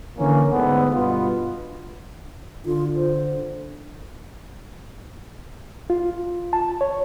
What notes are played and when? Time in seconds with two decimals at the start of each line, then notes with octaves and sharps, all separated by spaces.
0.17 D3 E3 A#3 C#4
0.49 D2 G#2 D3 B3
0.95 G2 B2 B3 F4
2.66 D3 F4
2.96 C5
5.90 F4
6.53 A5
6.81 C#5